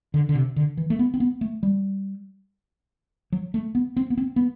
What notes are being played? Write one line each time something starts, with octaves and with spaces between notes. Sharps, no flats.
D3
D3
C3
D3
E3
A3
B3
C4
B3
A3
G3
F#3
A3
B3
C4
B3
C4
B3